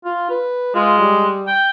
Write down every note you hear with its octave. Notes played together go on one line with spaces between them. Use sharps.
F4
B4
G#3 F4
G3
G5